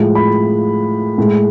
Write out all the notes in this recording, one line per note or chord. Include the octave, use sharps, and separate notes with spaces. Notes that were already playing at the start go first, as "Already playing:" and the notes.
Already playing: A2 F3 G#3
B5
A2 G#3